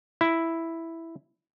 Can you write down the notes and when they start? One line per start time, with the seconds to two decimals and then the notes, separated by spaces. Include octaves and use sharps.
0.21 E4